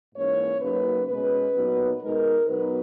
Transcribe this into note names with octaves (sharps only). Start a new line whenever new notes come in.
G#2 E3 A#3 C#4 C#5
F#2 C#3 F#3 A#3 D#4 B4
B2 G#3 C#4 B4
A#2 F#3 B3 D#4
B2 G#3 D#4 A#4
B2 F#3 B3 D#4 B4